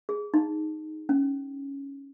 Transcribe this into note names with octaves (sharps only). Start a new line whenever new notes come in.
G#4
D#4
C#4